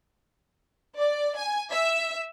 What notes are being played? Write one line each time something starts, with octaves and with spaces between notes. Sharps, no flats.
D5
G#5
E5